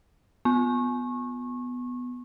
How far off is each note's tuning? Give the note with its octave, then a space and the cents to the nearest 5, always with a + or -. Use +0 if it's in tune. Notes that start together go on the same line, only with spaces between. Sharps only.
B3 +5 C#6 -25